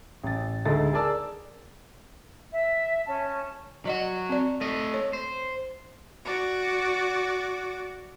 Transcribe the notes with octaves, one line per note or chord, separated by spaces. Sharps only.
A1 A6
D2 G#3 D#4 A4 A6
G#4 A#4 D5 A5 E6
E5
C#4 A5
F#3 F#4 D5 D#5 F#5
C4 D5
A3 D#5
C#5
C5
F#4 D5